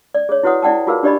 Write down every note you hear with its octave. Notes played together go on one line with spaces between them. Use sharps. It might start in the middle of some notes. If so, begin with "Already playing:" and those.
D5
G#4 C#5
E4 F#4 B4 C#5 F#5 D#6
E4 D5 F#5 G5 A5
F4 F#4 G#4 A#4 B4 F5
D4 G4 D5 D#5 B5